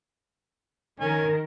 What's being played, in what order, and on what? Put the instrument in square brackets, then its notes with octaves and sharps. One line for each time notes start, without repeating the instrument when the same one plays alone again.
[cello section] D#3 A#4 [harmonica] C#4 G#5